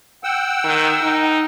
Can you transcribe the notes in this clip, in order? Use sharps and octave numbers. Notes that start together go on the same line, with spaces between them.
F#5 G5 E6
D#3
D#4